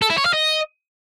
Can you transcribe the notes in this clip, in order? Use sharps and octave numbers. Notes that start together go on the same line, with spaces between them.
A4
E4
C#5
F5
D#5